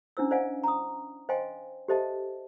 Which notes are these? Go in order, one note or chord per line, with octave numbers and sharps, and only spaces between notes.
C#4 D4 E4 C5 E6
C5 D5 D#5 F5 F#5 G#5
A#5 D#6
C5 D#5 F5 G5 G#5 C6
G4 A4 C5 D#5 E5 A5